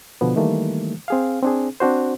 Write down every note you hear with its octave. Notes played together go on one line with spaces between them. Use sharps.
B2 D3 F3 B3
D#3 E3 G3 A3 A#3
C4 G#4 F5
C4 D4 G#4
C4 D4 F#4 C5